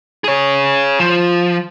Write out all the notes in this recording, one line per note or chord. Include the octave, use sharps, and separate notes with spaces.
G#4 C#5
F3